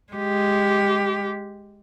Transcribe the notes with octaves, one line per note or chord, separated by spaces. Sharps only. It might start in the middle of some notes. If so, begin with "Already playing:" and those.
G#3 G4